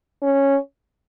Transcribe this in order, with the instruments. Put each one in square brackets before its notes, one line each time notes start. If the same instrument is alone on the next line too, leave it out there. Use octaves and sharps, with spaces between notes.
[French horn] C#4